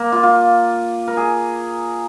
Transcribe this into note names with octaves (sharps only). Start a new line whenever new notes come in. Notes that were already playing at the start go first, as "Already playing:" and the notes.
Already playing: A#3
F4
F4
A#4
G#4